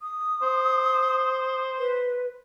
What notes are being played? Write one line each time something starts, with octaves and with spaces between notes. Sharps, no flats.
D#6
C5
B4